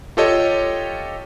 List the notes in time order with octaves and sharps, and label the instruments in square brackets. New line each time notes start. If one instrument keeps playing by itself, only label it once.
[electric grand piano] F4 G4 A4 C#5 D#5